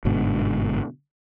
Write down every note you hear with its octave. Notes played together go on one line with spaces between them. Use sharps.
G1 G#2 B2 D3